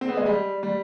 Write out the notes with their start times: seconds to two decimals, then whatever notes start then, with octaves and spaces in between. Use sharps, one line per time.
0.01 C4
0.09 B3
0.17 G#3
0.25 G3
0.63 G3